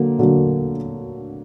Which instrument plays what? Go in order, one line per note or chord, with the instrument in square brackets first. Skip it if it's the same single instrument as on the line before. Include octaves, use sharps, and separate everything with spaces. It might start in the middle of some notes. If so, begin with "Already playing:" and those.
Already playing: [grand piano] D3 F#3 A#3
D3 F#3 A#3